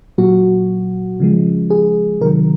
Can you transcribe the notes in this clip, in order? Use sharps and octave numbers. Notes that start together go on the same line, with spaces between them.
A#2 F#3 F#4
C#3 F3 G#3
G#4
C3 D#3 F#3 A#4